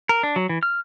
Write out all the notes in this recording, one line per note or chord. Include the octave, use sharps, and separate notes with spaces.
A#4
D4
F#3
E3
F6